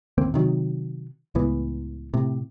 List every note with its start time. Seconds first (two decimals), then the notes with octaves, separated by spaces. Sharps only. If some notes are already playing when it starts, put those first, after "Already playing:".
0.18 A1 D#2 A#3 C4
0.34 C3 D#3 F#3
1.35 C#2 A2 E3 B3
2.14 A2 C3